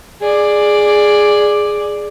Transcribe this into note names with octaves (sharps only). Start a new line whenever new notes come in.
G#4 D5